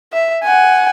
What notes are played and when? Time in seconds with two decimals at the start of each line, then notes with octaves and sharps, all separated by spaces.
0.13 E5
0.44 F#5 G#5